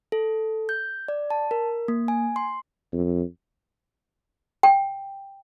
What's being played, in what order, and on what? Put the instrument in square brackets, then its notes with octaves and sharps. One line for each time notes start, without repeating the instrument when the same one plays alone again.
[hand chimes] A4
G6
D5
A5
A#4
A#3
G#5
C6
[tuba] F2
[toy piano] G5